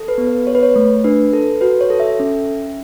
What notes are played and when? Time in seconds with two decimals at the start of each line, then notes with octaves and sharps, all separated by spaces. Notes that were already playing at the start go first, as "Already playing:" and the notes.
Already playing: A4
0.08 B4
0.18 B3
0.27 B4
0.46 G#4 C#5
0.55 B4
0.63 C#5
0.76 A3
1.04 D4 B4
1.33 A4
1.61 F#4 B4
1.81 C#5
1.90 A4
2.00 E5
2.20 C#4